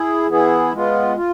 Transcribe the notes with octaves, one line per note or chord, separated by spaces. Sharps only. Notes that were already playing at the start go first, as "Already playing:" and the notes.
Already playing: E4 G#4
E3 B3 E4 G#4
G#3 B3 F4
F4